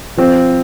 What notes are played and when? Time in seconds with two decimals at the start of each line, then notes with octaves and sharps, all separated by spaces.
0.17 F3 C4